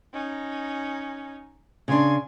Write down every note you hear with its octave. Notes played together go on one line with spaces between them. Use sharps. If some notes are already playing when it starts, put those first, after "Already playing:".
C#4 D#4
C#3 D4 G#5 C6